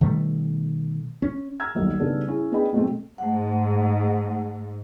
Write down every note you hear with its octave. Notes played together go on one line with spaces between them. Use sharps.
B2 D#3 G3 A3
C#4
A#5 E6 F6 G#6
D#1 B1 D#3 G3
C#3 G3 B3 D4 D#4 A4
C#4 E4 G#4
B3 D4 G#4 D#5 G5 B5
B2 F#3 G#3 A3 C4
G#2 A3 F#5